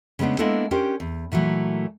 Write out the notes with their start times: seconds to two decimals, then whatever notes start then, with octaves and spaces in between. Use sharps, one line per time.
0.19 C#3 G#3 A3 B3 D4
0.39 G#3 A#3 B3 D4 E4 A4
0.71 C#4 D4 G4 A#4 C5
1.00 E2
1.32 A#2 E3 F#3 A3